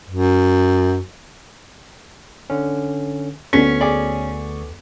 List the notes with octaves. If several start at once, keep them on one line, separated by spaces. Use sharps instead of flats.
F#2
D3 C#4
D2 B3 C#4 A4 C#6 B6
G#4 D5